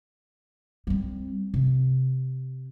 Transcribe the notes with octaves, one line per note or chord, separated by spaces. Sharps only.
G3 C4
C3